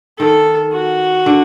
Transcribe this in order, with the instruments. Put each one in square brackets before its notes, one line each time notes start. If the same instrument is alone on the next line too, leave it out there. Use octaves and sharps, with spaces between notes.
[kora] D#3 [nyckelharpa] A4
[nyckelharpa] F#4
[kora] D3